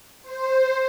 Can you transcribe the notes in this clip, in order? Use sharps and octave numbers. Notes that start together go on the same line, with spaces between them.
C5